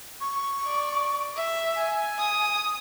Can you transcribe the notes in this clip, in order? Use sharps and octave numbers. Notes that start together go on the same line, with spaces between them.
C#6
D5
E5
G#5
D#6